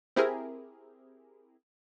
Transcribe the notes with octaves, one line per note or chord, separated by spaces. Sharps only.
C4 E4 G4 G#4 A#4